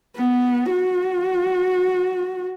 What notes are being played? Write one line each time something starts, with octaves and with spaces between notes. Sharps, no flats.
B3
F#4